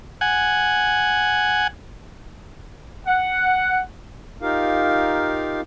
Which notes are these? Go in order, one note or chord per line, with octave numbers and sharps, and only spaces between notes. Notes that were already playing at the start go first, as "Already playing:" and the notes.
F#5 G#5
F#5
D#4 F4 G4 A#4 F5